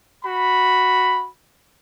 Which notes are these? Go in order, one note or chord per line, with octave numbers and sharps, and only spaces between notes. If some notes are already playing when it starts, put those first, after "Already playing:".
F#4 B5